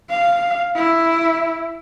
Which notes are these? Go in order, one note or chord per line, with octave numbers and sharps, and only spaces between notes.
F5
E4